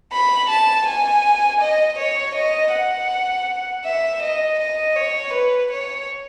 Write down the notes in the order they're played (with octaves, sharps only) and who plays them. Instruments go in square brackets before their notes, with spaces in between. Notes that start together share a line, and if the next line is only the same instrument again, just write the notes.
[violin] B5
A5
G#5
D#5
C#5
D#5
F#5
E5
D#5
D#5
C#5
B4
C#5